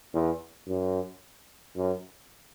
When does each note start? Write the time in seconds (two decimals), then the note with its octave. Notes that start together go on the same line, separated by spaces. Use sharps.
0.14 E2
0.68 F#2
1.76 F#2